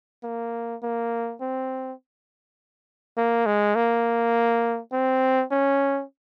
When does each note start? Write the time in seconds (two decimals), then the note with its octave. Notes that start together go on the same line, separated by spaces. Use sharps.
0.23 A#3
0.83 A#3
1.41 C4
3.17 A#3
3.46 G#3
3.75 A#3
4.92 C4
5.51 C#4